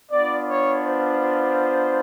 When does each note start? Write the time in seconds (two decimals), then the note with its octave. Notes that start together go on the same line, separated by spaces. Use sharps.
0.11 B3 D4 F4 D5
0.47 C#5
0.84 C5